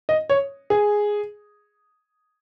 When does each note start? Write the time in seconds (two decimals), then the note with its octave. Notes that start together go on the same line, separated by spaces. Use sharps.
0.09 D#5
0.29 C#5
0.70 G#4